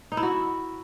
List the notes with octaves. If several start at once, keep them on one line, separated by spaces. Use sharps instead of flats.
D#4
E4
F#4